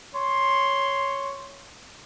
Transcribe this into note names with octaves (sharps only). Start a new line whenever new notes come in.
C#5 C6